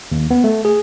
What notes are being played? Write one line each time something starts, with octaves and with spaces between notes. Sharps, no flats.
D#2
B3
A3
G#4